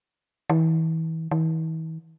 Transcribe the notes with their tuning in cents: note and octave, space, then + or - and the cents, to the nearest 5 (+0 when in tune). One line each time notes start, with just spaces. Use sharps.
E3 -35
E3 -45